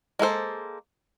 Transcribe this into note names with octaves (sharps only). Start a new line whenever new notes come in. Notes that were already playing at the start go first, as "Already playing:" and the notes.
G#3 A#3 A4 C5